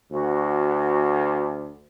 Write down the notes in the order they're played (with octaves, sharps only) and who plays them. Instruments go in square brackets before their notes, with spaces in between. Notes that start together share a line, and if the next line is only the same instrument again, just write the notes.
[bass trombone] D2 [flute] F#4